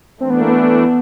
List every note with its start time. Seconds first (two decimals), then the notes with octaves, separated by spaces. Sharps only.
0.20 E3 A3 C4 D4
0.30 B3
0.41 A#3
0.50 B3